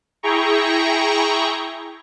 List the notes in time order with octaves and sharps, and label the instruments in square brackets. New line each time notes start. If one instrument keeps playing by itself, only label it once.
[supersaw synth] E4 G#4 G5 A#5 C#6